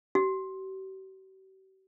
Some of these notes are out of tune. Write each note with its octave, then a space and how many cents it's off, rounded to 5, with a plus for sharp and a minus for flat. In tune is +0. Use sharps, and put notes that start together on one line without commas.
G4 -45